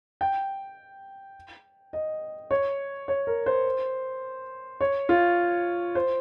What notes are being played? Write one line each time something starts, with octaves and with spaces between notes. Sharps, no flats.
G5
D#5
C#5
C#5
A#4
C5
C#5
F4
C5